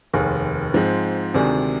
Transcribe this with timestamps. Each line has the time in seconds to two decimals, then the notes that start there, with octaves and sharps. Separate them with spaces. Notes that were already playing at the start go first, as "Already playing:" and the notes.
0.13 F1 D#2 D#3 G#4
0.74 G#2 F3 G#3 C4
1.34 D2 C3 D#3 G#3 D4 G#4